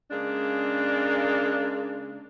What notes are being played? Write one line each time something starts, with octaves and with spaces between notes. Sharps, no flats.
C#3 G#3 A#3 D4